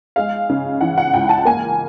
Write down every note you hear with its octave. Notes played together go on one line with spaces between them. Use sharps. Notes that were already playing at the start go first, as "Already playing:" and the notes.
G#3 F5
C#3
E3 F#5
F#5
C#2 G5
A5
A#3 G#5